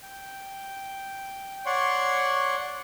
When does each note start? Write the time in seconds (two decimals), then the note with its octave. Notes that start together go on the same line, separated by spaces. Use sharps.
0.03 G5
1.66 C#5 D5 F#5 C6 C#6